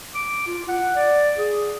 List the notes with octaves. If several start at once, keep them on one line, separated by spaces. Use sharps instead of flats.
D6
F4
F#5
D5
G#4